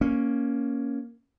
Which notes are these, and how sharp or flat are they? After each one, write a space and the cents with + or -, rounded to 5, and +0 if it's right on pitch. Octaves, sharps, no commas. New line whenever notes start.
A#3 +5 C#4 +0